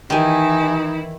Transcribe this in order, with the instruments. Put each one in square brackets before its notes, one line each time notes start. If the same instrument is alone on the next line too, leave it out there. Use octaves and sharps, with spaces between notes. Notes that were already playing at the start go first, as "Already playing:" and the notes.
[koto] D#3 [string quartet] E3 E4 [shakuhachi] D#4 [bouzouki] G4 G#5